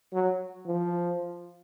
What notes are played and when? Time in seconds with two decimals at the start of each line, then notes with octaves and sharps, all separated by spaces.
0.14 F#3
0.66 F3